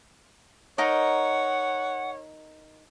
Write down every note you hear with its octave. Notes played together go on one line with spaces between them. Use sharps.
D#4 A#4 C#5 D#5 F#5